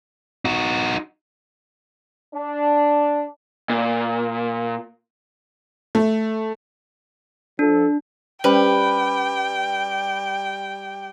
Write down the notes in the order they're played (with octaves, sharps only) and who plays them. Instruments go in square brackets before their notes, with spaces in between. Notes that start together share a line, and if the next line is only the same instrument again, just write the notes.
[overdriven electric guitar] D#4 F#4
[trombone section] D4
[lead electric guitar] A#2
[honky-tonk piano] A3
[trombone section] F3 A4 [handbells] D4
[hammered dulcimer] G3 [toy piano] C#4 C5 [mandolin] B4 [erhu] G5